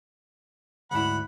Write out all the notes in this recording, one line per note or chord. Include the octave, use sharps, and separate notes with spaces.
D2 G#2 E4 F#5 B5